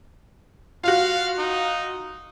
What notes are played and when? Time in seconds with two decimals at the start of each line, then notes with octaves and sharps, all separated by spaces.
0.84 F4 F#4 F5
1.38 D#4